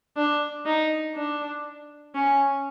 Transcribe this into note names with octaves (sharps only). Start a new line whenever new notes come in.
D4
D#4
D4
C#4